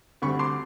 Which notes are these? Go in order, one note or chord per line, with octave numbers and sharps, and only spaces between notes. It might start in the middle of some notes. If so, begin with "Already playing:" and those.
D2 D3 G3 C4 B5 C#6
C6 D6